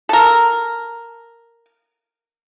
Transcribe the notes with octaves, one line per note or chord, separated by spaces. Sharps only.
A4 A#4